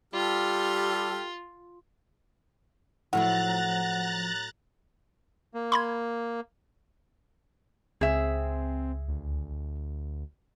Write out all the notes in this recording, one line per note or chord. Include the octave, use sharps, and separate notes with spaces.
G3 F4 G4 A4 F6
A2 F3 F#3 E4 F#5 A#5 F#6 A6
A#3
B5 C6 G#6
C#2 C4 G#4 E5
D2